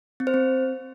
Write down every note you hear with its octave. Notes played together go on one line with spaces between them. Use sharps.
C4
C5
C4